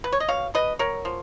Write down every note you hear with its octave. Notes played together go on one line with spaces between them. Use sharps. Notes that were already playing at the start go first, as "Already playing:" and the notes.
B4
C#5
D#5
B2 C#5 F5
B2 B4 D#5
F#3 A#4 C#5
F3